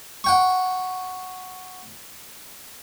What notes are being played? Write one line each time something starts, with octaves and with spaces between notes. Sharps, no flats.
F#5 G5 C#6